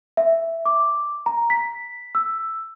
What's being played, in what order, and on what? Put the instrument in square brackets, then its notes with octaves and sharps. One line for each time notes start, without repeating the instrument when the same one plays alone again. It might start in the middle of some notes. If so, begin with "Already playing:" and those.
[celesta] E5
D6
A#5
B6
E6